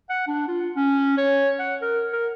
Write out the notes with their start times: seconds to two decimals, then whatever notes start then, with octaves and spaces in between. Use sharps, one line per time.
0.10 F#5
0.27 D4
0.48 F4
0.76 C#4
1.18 C#5
1.59 F#5
1.82 A#4
2.13 A#4